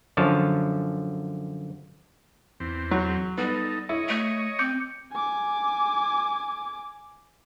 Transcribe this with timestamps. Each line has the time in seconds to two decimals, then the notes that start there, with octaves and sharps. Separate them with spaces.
0.17 F#2 D3 F3 C#5 A5
2.60 E2 C4
2.91 F#3
3.38 G3 B3 D#4 A4
3.89 E4 C#5 D#5
4.08 A3
4.59 C4 D6 G6 C#7
5.12 G#5 D6